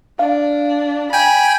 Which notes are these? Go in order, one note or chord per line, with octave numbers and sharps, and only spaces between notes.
D4 F5
G5 G#5 B5